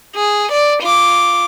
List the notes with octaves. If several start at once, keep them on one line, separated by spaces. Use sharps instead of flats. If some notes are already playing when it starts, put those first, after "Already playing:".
G#4
D5
F4 D6